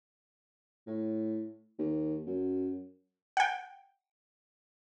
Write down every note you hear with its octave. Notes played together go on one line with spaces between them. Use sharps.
A2
D#2
F#2
F#5 G5